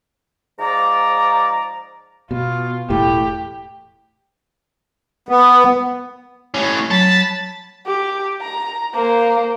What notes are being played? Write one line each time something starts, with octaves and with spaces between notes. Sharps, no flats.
G#2 F3 D5 A#5
B2 F4
E1 A2 G4
B3
A2 C#4
F#3 A5 B5 A6
G4
A#5
A#3 C5